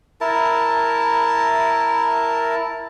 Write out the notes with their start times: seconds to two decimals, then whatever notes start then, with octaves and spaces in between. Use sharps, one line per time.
0.21 E4 A#4 A5